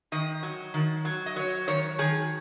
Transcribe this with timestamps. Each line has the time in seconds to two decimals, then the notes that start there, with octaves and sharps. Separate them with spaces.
0.12 D#3 D#5
0.43 F#3
0.74 D#3
1.05 F#3
1.26 D#5
1.36 F#3 C#5
1.67 D#3 C#5
1.98 D#3 G#4